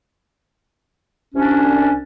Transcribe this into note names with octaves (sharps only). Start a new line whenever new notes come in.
C2 C#4 D4